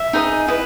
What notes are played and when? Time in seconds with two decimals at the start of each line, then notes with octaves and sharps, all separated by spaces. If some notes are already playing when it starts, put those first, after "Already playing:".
Already playing: E5
0.13 D#4 G#4 B4 D#5
0.48 E4 B4 D#5